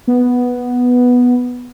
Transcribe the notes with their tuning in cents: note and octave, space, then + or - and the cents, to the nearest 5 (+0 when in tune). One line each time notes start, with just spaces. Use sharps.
B3 -5